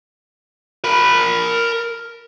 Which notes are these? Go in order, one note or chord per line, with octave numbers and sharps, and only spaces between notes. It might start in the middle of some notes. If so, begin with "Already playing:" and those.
A#4 B5